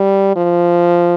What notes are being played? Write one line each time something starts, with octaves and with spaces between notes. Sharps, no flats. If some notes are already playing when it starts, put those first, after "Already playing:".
Already playing: G3
F3